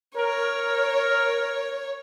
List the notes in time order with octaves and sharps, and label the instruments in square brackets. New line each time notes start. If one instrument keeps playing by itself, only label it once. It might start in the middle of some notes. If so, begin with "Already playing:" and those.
[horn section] A#4 [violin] C#5